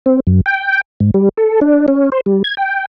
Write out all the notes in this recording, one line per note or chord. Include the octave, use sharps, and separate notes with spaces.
C4
F#2
G5
G#2
G3
A4
D4
C#4
C5
G3
G#6
G5